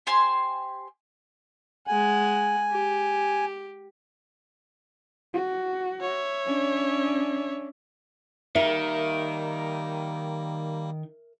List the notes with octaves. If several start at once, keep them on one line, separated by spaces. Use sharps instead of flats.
G4 C5 G#5 C6
G#3 F#5 G#5
G4
F#4
C#5 E5
C#4 D4
D#3 G3 A#3 A#4 E5